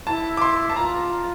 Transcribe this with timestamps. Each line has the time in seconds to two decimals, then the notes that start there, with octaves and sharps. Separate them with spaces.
0.07 E4 A5
0.37 D6
0.41 C6
0.70 A5
0.76 F4 A#5